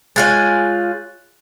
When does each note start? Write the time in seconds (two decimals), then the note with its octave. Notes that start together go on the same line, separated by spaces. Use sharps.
0.16 G#3 F4 C#5 G#5 F#6 A6